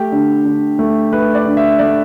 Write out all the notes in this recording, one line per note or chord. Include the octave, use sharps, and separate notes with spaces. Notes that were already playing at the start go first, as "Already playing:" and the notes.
Already playing: A3 G4
D3
D3
A3
A3 B4
D5
D3
E5
A3 D5